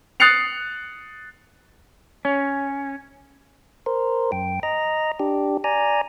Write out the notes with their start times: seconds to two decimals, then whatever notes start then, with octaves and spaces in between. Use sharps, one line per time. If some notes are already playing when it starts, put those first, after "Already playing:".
0.20 D#6 F#6 A6 C7 C#7 F7
2.25 C#4
3.86 A#4 C5
4.32 F#2 G5
4.63 D#5 A#5
5.20 D4 G4
5.64 D5 G#5 A#5